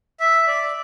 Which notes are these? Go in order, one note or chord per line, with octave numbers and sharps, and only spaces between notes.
E5
D5